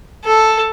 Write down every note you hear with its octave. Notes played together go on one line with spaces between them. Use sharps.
A4